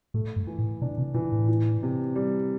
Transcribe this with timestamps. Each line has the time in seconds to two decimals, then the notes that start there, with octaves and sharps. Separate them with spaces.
0.14 A2 A3
0.36 G2
0.47 E3
0.59 A2
0.82 B2 D4
0.98 C3
1.14 B2 E3
1.32 A2
1.49 E3
1.83 C3
2.16 G3